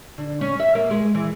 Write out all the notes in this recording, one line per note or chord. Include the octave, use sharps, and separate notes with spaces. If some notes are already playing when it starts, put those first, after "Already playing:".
D3
C#4
E5
A#3
G#3
E3